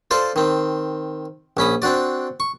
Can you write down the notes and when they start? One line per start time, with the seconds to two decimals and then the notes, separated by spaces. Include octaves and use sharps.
0.11 F4 A4 C5 D5
0.36 D#3 C4
1.57 A#1 C#4 B5 D#6
1.82 C4 D4 F#4 D5
2.40 C#6